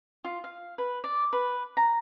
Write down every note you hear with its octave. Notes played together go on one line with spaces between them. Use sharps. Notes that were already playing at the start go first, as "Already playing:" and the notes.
F4
F5
B4
D5
B4
A#5